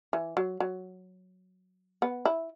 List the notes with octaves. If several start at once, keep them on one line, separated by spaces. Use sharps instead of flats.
E3
F#3
F#3
B3
E4